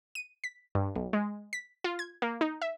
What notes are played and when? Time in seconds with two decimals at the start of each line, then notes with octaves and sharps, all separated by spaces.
0.15 D#7
0.44 B6
0.75 G2
0.95 B1
1.13 G#3
1.53 B6
1.84 F4
1.99 G#6
2.22 A#3
2.41 D#4
2.62 E5